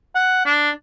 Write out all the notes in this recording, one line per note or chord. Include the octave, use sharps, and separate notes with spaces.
F#5
D4